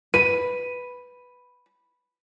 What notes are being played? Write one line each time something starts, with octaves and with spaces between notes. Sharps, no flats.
B4 D#7